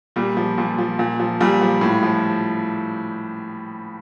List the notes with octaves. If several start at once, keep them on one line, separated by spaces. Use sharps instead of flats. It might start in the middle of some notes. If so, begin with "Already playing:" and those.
A#2 G3
F3
A#2
F3
A#2
F3
A#2 G3
F3
A2
F3